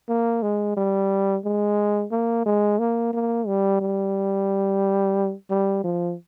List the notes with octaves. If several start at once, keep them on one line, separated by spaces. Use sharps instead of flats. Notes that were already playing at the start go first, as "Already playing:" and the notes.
A#3
G#3
G3
G#3
A#3
G#3
A#3
A#3
G3
G3
G3
F3